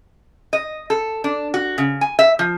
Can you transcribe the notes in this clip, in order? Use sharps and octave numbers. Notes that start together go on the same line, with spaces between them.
D#5
A4
D4
F#4
C#3
G#5
E5
F3